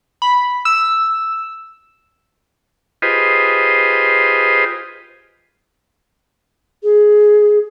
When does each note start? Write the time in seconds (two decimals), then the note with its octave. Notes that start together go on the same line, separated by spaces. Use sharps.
0.22 B5
0.65 E6
3.02 F4 G4 G#4 B4 C5 D#5
6.83 G#4